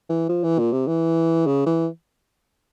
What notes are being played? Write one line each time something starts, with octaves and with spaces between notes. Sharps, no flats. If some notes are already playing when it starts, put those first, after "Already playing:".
E3
F3
E3
A#2
C3
E3
C#3
E3